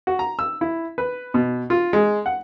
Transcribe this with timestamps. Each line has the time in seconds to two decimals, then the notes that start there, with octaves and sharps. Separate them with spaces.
0.07 F#4
0.19 A#5
0.39 E6
0.61 E4
0.98 B4
1.34 B2
1.70 F4
1.93 G#3
2.26 F#5